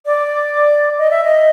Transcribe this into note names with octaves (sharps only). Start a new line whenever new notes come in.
D5
D#5
E5
D#5